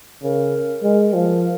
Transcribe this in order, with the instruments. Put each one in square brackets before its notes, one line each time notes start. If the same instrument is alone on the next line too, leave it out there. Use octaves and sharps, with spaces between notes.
[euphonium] C#3 [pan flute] A#4
[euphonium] G#3
F3